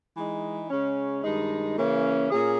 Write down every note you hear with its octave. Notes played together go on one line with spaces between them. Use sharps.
E3 G#3 D#4
C#3 G#3 C#4
G2 D#3 G#3 D#4
C#3 E3 A#3 C#4
A#2 A#3 C#4 G#4